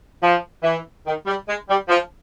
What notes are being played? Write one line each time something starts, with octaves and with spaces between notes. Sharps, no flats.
F3
E3
D#3
G3
G#3
G3
F3